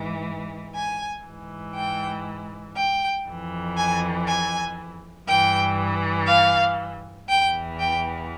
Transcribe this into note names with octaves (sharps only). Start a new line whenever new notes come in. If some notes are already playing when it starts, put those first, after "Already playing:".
Already playing: G#2 E3
G#5
G#2 E3
G5
G5
F2 E3
G#5
G#5
G2 E3 G5
F5
E2 E3 G5
G5